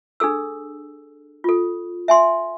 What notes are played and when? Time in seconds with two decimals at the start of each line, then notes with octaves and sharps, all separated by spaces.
0.20 D4 G#4 A4 E6
1.44 F4 A4
2.08 E5 G#5 C6